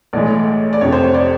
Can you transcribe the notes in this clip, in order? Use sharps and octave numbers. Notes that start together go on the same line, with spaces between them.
B1 A2 E3 G#3 D5
D5
F1 F2 C3 C#5
C5
C#5
D5